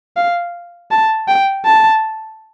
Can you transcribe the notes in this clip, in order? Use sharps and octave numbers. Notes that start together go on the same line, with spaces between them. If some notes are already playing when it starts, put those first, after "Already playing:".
F5
A5
G5
A5